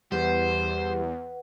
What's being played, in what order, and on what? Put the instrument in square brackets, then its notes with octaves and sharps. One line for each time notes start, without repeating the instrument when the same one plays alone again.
[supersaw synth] E2 [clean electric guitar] G3 [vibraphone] B4 F#5 [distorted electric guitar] C5